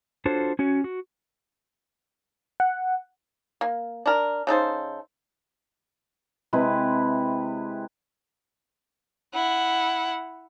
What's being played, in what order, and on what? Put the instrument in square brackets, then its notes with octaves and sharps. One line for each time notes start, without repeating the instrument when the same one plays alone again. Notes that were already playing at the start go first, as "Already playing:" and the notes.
[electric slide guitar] D4 F4 F#4 A4 C5 C#5
C#4 F#4 C#5
F#4
[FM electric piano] F#5
[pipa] A#3
D4 A#4
C#3 D#4 A4 C5
[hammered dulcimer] C3 G#3 E4 B4
[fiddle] E4 F#5